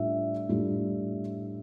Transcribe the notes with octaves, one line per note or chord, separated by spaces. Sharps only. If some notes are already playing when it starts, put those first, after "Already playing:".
Already playing: A2 G3 D4 F4 E5
A2 G3 D4 F4